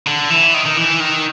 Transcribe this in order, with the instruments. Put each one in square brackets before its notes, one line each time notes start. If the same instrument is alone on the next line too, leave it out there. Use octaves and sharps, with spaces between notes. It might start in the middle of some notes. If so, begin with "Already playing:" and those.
[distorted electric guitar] D3
E3
D#3
D#3
E3
D#3